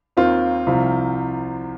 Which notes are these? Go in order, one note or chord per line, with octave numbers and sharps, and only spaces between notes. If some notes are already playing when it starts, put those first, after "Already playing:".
D#2 D#3 C4 F4
C2 C3 F3